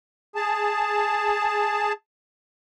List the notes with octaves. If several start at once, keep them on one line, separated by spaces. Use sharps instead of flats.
G#4 A5